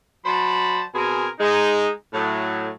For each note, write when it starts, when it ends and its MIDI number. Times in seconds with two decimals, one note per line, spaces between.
0.25 0.82 54
0.25 0.82 72
0.25 0.82 74
0.25 0.82 81
0.25 0.82 83
0.95 1.27 47
0.95 1.27 60
0.95 1.27 68
0.95 1.27 70
0.95 1.27 80
1.40 1.89 56
1.40 1.89 63
2.14 2.70 45
2.14 2.70 54
2.14 2.70 57